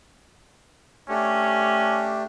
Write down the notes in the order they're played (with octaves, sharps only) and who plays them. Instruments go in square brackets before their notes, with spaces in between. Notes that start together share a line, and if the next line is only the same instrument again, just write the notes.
[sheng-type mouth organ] A3 D4 G4 [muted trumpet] C#4